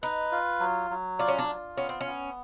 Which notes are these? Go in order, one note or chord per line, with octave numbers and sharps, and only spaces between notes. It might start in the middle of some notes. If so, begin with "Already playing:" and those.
D#4 B4
F4
F#3
F#3
D4 F4
C#4
D4
F4
B3 C#4
C4
C#4
B3